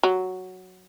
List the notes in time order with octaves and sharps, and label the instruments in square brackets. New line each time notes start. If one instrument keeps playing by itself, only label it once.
[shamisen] F#3